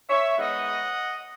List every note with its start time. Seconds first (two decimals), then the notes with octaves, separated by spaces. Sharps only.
0.09 C#5 E5
0.38 D#3 G#3 B3 D#4 D#5 F#5